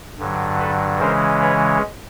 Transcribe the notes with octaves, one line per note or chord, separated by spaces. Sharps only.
G2 D3 F#3
A4 B4
C#3 E3 G#3 C#4 A#4 C5
B4 C#5